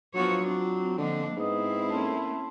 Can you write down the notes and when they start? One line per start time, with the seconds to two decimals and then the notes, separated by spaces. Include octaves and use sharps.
0.14 F3 F#3 B3 D4 F4 F#4 C#5
0.44 C4 D4 F4
0.98 D3 F3 A#3 D4 D#5
1.37 G#2 B3 C4 E4 B4 D#5 D#6
1.90 A3 A#3 C#4 A5 C6